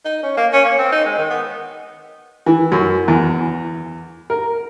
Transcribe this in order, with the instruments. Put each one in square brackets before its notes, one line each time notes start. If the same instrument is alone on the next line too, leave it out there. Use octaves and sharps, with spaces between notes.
[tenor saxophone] D#4
C#4
A#3
C#4
A#3
C4
D#4
G#3
D#3
B3
[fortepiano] E3
F#2
E2
A#4